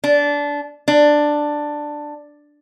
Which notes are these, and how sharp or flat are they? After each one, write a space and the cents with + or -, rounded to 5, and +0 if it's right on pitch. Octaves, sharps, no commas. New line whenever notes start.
D4 -20
D4 +10